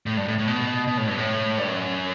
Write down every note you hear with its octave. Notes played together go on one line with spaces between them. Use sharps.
A2
G2
A2
A2
B2
B2
A2
G2
A2
G2
F#2